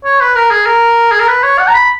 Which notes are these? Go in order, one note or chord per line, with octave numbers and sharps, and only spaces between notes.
C#5
B4
A#4
G#4
A#4
G#4
A#4
B4
C#5
F#5
A#5
B5